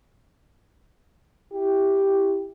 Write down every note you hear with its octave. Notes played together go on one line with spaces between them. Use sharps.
E4 G4